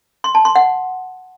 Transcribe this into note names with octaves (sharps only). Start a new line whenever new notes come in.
C6
A5
C6
F#5